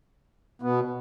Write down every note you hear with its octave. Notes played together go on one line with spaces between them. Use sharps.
B2 B3